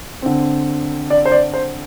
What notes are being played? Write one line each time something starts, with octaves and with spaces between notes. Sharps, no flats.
D3 C4
D5
C5
D5
C5